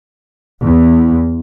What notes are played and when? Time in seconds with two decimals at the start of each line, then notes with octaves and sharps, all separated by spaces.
0.62 E2